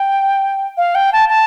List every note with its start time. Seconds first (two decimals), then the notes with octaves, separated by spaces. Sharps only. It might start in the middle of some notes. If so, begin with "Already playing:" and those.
Already playing: G5
0.77 F5
0.95 G5
1.13 A5
1.29 A5